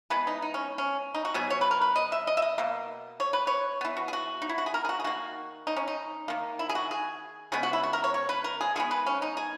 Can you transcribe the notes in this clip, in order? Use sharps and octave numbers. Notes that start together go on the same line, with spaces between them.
E3 G#3 B3 B4
D#4
D#4
C#4
C#4
D#4
F#4
B2 F#3 B3 G#4
C#5
B4
A#4
B4
D#5
E5
D#5
E5
D#5
B2 A#3
C#5
B4
C#5
E3 B3
F#4
G#4
F#4
D#4
E4
F#4
G#4
A#4
G#4
F#4
G#4
D#3 A#3 F#4
D#4
C#4
D#4
D#3 A#3
E4
G#4
F#4
G#4
C#3 G#3 B3 G#4
F#4
E4
F#4
A#4
C#5
C#5
B4
A#4
G#4
D#3 G#3 B3 G#4
B4
C#4
D#4
G#4